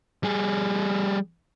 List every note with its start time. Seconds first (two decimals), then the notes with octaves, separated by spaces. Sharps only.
0.23 G3 G#4